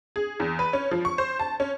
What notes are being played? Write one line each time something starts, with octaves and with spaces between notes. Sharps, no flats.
G#4
E2
B4
C#4
F3
C#6
C5
A5
C#4